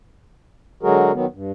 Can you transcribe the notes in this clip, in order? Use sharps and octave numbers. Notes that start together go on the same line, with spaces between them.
D3 F#3 G#3 F#4 G#4 A#4
D#3 F#3 B3
G2